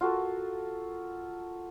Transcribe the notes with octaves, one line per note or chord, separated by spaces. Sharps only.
F4 F#4 A4 A#4